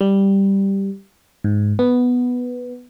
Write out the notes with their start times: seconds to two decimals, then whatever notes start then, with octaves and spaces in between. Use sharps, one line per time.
0.01 G3
1.44 G#2
1.79 B3